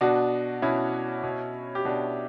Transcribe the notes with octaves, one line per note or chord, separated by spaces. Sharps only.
B2 D4 F#4
B2 C#4 E4
B2
G4
B2 D4 F#4